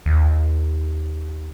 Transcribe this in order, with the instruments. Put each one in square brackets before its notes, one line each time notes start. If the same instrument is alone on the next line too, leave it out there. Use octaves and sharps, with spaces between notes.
[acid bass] D#2